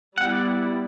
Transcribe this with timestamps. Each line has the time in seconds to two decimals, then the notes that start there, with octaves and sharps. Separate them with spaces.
0.17 G3 B3 E4 F#5
0.32 D5